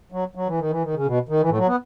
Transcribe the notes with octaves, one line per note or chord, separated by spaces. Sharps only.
F#3
F#3
E3
D#3
E3
D#3
C#3
B2
D#3
E3
A2
F#3
B3